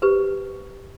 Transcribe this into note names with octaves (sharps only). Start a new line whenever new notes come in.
G4 B4 C5